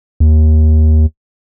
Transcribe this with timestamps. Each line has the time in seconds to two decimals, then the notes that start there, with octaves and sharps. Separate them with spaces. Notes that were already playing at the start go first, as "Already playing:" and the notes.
0.20 D#2